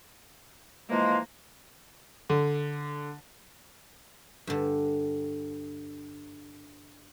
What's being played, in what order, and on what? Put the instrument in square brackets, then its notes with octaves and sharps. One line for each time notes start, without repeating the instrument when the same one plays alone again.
[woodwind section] E3 F3 G#3 [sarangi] A#3
[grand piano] D3
[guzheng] G2 D3